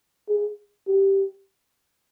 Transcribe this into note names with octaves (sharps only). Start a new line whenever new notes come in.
G#4
G4